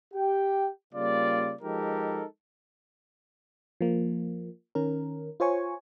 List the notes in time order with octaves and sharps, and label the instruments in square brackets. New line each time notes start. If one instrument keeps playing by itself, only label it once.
[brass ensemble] G4 G5
C#3 G3 A#3 F4 D5
F3 G#3 D#4 G4 A4 A#4
[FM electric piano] F3 A#3
D#3 C#4 A#4
F4 C5 C#5 G#5 C#6